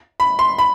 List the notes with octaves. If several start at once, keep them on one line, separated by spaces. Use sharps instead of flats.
B5
C6
B5